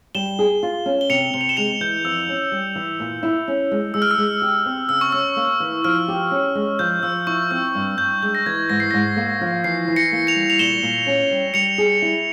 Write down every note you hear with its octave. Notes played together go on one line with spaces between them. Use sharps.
G3 E7 G7
G#4
F4
C#4
G7
C3 C#7 F7
C3 G7
F7
E7 G7
G#3 C#7 F7
E3 G6
F2 E6
C#4
G3
E3
A#2
E4
C#4
G#3
G#3 E6
F6
E6
G#3
G4
C4
C#3 E6
C#6
C#4 E6
A#3
E3
F3 F6
G4
C#4
G#3
F3 G6
F3 E6
E4 C#6
C4 E6
G2
G2 G6
G#3 G6
A#6
E3 G#6
G#2 A#6
C7
G#2 A#6
A#3
F3
E3 C7
E3
A#6 C#7
A#3
C#7 F7
G3
F7
A#2 E7 G7
A#2
C#4
G3
G3 C#7 F7
G#4
E4